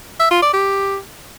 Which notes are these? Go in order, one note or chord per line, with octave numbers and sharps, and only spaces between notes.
E5
F4
D5
G4